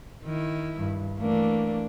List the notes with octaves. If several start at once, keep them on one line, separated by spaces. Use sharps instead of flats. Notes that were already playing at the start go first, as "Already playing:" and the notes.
D#3 E4
G2
E3 A3 A#3 D4